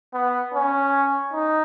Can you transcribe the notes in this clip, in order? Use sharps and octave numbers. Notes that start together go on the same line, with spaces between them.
B3
C#4
D#4